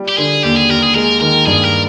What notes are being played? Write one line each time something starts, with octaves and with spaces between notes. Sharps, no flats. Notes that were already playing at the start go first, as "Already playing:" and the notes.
Already playing: G3
G4
D3 G#4
D#2 G4
G#4
D#2 A#4
G#4
G#3 A#4
D#3 A#4
G2 G#4
A#4